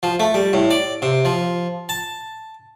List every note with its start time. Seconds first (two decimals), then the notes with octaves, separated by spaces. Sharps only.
0.03 F3
0.20 A3
0.34 G3
0.53 A2
0.70 D5
1.02 C3
1.25 F3
1.89 A5